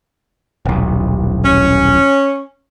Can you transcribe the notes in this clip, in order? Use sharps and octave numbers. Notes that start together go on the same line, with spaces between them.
D#1 B1
C#4